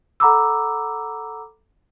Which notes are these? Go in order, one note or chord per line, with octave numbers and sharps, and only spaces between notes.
A4 F#5 A#5 B5 D6 E6